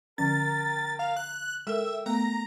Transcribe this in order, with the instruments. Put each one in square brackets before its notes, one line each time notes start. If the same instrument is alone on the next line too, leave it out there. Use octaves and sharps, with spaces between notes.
[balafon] D3 F3 C#4 [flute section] A#4 G5 A#5 [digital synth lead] A6
[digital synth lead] F5
F#6
[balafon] G#3 A4 A#4 [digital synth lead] E5 [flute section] G5
[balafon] A3 B3 [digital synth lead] A#5